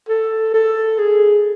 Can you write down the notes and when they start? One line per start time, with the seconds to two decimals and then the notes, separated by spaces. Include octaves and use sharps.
0.09 A4
0.54 A4
0.99 G#4